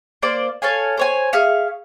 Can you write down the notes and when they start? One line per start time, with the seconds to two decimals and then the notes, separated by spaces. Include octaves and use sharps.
0.23 A#3 C5 D5 C6
0.62 A4 C#5 F5 G#5
0.97 C5 C#5 G#5
1.33 G#4 E5 F5 C#6